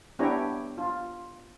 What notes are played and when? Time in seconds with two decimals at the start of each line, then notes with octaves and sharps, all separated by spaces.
0.19 B3 D4 E4 G4 C#5 A#5
0.78 F4